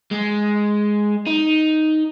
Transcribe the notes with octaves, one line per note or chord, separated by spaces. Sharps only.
G#3
D#4